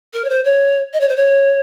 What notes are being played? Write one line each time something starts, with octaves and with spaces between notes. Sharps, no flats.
A#4
C#5
C5
C#5
D#5
C#5
C5
C#5